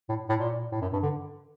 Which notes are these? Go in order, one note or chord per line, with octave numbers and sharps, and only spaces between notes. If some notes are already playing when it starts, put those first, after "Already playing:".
A2
A2
A#2
A2
F#2
G2
D3